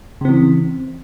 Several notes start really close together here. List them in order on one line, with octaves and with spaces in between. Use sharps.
C#3 C4 E3